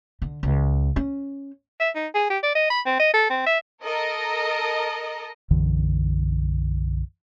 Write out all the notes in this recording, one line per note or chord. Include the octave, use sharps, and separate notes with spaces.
D3
C#2
C#4
E5
D#4
G#4
G4
D5
D#5
B5
C4
D#5
A4
C4
E5
A4 A#4 D#5
B1 F#2 D3 E3